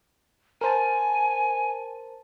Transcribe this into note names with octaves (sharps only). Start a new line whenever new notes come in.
A#4 C5 G#5 A5